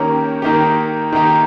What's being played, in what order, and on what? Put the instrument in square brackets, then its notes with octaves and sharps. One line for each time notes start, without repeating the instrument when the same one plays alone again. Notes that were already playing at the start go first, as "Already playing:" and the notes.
Already playing: [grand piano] D#3 A#3 C#4 G4
D#3 A#3 D#4 G4
D#3 A#3 D#4 G4